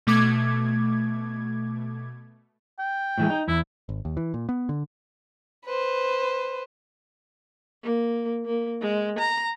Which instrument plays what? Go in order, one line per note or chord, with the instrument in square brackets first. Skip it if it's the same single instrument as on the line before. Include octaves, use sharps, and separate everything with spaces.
[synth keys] B2 A3 D6 G#6
[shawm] G5
[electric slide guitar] A2 E3 G#3
D#4
[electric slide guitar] E2 [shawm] E4
[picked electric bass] G#1
D#2
E3
A#2
B3
D3
[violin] B4 C5
[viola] A#3
A#3
G#3
A#5